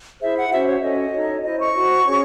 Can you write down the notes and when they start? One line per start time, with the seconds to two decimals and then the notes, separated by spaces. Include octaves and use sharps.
0.20 E4 G#4 C5 E5
0.35 F#5
0.51 C#4 F#4 C5 E5
0.66 C#5
0.81 C#4 F#4 A4 C#5 D#5
1.13 D#4 A4 C#5
1.44 E4 C5 D#5
1.59 C#6
1.74 F#4 C5
2.06 C#4 G#4 C#5